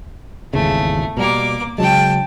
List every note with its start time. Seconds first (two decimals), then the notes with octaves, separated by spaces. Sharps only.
0.53 G#1 E2 C#3 A3
1.17 B2 G3 A#3 D6
1.78 C#3 F#3 G#3 G5 A5